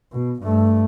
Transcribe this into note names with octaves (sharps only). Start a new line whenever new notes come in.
B2
G2 A3